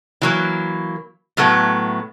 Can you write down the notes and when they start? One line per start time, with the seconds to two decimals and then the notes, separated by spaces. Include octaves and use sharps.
0.21 E3 F#3 A#3
1.37 A2 F#3 A3 B3